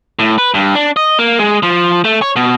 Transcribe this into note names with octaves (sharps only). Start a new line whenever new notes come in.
A2
B4
G2
D4
D#5
A#3
G#3
F3
A3
C#5
B2